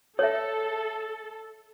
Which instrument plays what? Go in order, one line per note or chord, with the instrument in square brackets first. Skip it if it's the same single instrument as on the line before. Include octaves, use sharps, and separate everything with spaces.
[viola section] A4 [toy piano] C#5 E5